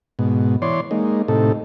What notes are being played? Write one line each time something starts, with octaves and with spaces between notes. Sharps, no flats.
G#2 B2
E3 C#5 D5 C6
G#3 A#3 D#4
A2 C3 D#4 A4